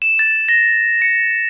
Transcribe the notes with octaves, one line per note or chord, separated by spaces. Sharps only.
E7
A6
A#6
C#7